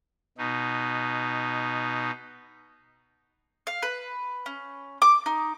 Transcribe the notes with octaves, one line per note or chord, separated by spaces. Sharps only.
B2 D#4
F5
B4
C#4
D6
D#4